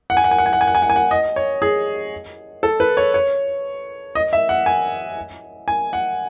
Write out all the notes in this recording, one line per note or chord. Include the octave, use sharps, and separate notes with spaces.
F#5
G#5
F#5
G#5
F#5
G#5
F#5
G#5
F#5
G#5
F#5
G#5
F#5
D#5
C#5
G#4
A4
B4
C#5
C#5
D#5
E5
F#5
G#5
G#5
F#5